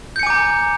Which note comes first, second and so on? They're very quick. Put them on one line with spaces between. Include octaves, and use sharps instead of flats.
G6 C#7 G#5 D6 A#5